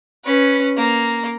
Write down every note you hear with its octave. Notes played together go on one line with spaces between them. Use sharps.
C#4 B4
A#3